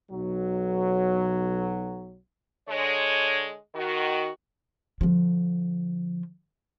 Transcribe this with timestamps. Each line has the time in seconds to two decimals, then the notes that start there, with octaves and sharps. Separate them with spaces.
0.11 B1 F#3
2.69 D3 G#3 C#5
3.75 D#3 F#4
5.01 D3 F3